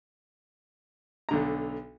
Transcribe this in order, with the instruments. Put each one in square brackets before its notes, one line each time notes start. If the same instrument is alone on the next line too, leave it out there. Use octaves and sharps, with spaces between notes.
[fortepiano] B1 D3 A#5